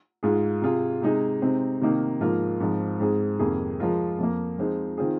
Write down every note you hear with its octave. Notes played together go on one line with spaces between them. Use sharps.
G#2 G#3 F4 G#4
C3 G#3 F4 G#4
C3 G#3 D#4 G#4
C3 G#3 C4 D#4
C3 D#3 A#3 D#4
G#2 F3 A#3 F4 A#4
G#2 F3 C4
G#2 G#3 C4 G#4
F2 C3 D#3 A#3 G#4
F3 G#3 F4 A#4
F2 F3 A#3
F3 G#3 C4 D#4
D#3 C4 F4 G#4